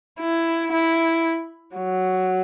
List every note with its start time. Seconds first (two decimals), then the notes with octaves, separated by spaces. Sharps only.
0.20 E4
0.73 E4
1.77 F#3